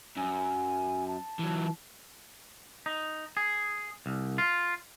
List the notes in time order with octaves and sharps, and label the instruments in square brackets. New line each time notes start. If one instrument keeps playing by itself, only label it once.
[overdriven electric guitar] F#2 [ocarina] G#5
[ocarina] A5
[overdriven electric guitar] E3 F#3
[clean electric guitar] D#4
G#4
C2
F4